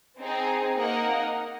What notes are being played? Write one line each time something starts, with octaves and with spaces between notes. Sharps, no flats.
C4 D#4 G#4
A#3 D#4 A#4 D#5 F#5